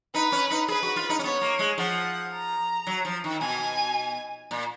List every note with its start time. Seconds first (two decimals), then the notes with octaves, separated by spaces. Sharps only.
0.14 D#4 B4
0.32 C#4
0.51 D#4
0.68 G#4 B4
0.83 F#4
0.96 F4
1.09 D#4
1.19 C#4
1.24 B3 C#5
1.41 A#3
1.59 G#3
1.78 F3 F#5
2.33 A#5
2.87 F#3
3.05 F3
3.24 D#3
3.41 B2 G#5
4.51 A#2